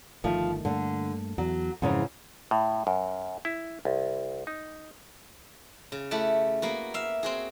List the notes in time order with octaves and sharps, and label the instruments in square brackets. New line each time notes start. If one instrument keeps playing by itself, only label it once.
[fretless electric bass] G1 D#3 A3 [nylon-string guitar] F3
[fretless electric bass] G2 A3 A#3 [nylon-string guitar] D3
[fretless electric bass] E2 [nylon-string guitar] F#3
[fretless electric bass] F2 C#4 [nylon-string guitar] G#2 C#3 E3
[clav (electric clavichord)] A2
F#2
E4
C2
D#4
[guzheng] C#3
A3 E4 G4 F#5 A5
A#3 B3 F#4
E5 F5
C4 F#4 G#4